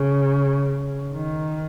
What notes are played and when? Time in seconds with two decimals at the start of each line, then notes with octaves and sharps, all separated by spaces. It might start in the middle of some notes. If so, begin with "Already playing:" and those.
Already playing: C#3
1.14 D#3